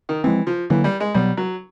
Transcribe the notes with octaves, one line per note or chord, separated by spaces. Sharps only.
D#3
E3 F3 G#3 C4
F3
D3 E3 F#3 A#3
G3
G#3
B2 F#3 G3 B3
F#3